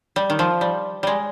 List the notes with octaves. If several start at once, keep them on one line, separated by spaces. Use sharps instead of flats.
G3
D#3
F3
G3
G3 G#3